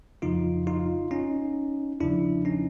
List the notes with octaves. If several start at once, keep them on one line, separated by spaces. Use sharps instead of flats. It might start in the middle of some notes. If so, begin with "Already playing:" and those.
F2 C#3 F3 D#4 F4
D#4 F4
C#4 D#4
E2 C#3 F3 D4 E4
C#4 D#4